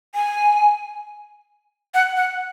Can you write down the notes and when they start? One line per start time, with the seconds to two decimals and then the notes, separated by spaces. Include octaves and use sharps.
0.15 G#5
1.94 F#5
2.17 F#5